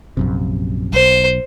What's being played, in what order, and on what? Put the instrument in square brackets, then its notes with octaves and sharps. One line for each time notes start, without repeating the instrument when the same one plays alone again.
[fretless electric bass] A#1 F#2 C3
[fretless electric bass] B1 [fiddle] C5